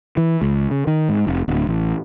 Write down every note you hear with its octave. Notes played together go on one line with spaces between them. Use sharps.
E3
C#2
C#3
D#3
G#2
F1
D1
A1